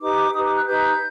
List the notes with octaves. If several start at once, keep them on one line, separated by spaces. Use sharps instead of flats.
D#4 G4 B4 D6
D#4 G4 B4 D#6
D6
F#6
D#4 G4 B4 G6